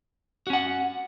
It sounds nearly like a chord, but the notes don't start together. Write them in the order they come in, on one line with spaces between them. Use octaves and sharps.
F#4 C#4 F#5